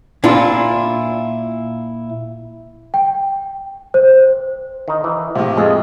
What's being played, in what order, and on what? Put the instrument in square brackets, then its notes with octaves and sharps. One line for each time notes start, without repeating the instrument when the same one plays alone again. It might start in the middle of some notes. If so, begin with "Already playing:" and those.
[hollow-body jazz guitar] A#2 D4 E4 F4
[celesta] G5
C5
[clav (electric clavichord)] D#3 D#4
E3
[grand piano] A2 C3 [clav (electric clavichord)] F3
[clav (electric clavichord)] F2 G#4 [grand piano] G#3